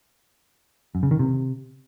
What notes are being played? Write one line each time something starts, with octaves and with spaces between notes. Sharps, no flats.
F#2
C#3
D#3
C3